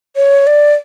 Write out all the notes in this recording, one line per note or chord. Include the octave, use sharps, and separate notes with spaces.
C#5
D5